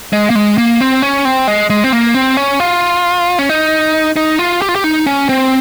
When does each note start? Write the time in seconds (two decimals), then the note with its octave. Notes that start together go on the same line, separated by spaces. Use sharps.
0.13 G#3
0.30 A#3
0.35 G#3
0.58 A#3
0.80 C4
1.02 C#4
1.25 C4
1.48 G#3
1.70 G#3
1.84 C4
1.92 A#3
2.14 C4
2.37 C#4
2.60 F4
3.39 C#4
3.49 D#4
4.16 D#4
4.39 F4
4.62 G4
4.69 F4
4.76 G4
4.84 D#4
5.06 C#4
5.29 C4